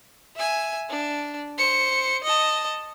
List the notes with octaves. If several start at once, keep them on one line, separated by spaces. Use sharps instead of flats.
E5 G#5
D4
C5 C#7
D#5 A5